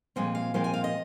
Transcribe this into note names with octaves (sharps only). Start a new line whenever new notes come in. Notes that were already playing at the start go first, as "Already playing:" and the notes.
A#2 F3 G#3 C4 D#5
F5
A#2 F3 G#3 C4 F5
G#5
F5
D#5